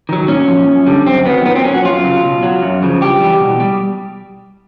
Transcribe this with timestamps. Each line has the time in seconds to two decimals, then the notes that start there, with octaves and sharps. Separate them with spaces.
0.09 D#3 F#3
0.28 A#2 C#4
0.48 F3
0.67 F#2
0.86 D3 G3
1.06 F#2 C4
1.26 D#3 F#3 B3
1.45 A#2 B3
1.55 C4
1.64 F#3 C#4
1.74 F#4
1.85 F#2 F4
2.04 C#3 F#3
2.23 B2
2.43 F#3
2.63 F#2
2.82 C#3 F3
3.01 G2 G4
3.20 E3 G3
3.40 B2
3.60 G3